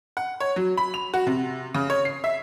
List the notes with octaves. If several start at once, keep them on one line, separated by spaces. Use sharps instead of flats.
F#5
C#5
F#3
B5
F7
F#4
C3
C#3
C#5
C7
E5